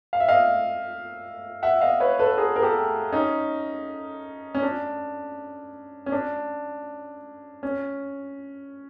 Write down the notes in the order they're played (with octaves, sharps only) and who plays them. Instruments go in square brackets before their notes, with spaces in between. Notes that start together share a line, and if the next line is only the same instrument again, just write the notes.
[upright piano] F5
E5
D#5 F5
E5 F#5
D#5 F5
B4 C#5
A4 B4
G#4 A#4
A#4
G4 A4
C#4 D#4
C#4
D4
C#4
D4
C#4